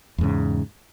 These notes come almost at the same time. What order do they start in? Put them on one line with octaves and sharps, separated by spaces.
E2 G#2 C#3